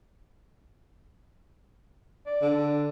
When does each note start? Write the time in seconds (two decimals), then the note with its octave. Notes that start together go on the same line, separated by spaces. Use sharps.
2.27 D5
2.42 D3